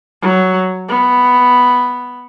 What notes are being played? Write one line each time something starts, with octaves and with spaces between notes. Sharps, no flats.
F#3
B3